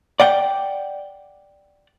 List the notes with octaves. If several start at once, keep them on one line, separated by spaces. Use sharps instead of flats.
D5 F#5 G5